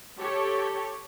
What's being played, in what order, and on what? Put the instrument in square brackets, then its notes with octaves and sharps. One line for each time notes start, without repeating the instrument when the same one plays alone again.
[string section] G4 A4 C#5